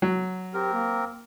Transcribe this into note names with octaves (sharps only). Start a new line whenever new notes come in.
F#3
C4 G4 A#4
A#3